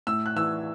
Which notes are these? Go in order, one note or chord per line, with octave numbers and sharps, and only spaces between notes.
A2 E6
F#6
E3 E6